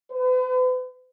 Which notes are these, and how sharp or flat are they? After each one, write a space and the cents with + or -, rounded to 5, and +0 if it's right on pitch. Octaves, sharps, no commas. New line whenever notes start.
B4 +45